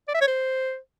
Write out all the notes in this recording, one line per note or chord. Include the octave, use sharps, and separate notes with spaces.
D5
E5
C#5
C5